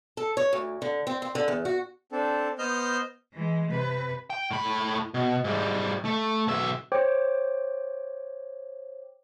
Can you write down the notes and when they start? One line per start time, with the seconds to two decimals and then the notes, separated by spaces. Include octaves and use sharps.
0.17 A4
0.37 C#5
0.53 D2
0.82 D3
1.07 C4
1.22 C4
1.35 D3
1.48 E2
1.65 F#4
2.12 C4 D4 A4
2.59 B3 C5 D#5 F6 G6
3.34 E3 G#3
3.71 C3 B4
4.30 G5
4.51 A2 B5
5.14 B2
5.44 G#2 G3
6.05 A3
6.47 B1 E5
6.92 C5 C#5 G5 D6